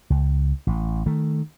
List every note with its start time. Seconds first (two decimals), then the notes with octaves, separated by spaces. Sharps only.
0.10 C#2
0.67 A1
1.06 D#3 A3